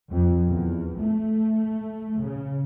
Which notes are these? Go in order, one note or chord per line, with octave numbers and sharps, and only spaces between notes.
F2
E2
A3
C#3